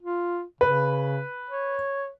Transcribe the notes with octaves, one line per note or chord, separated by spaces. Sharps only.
F4
C#3 B4
C#5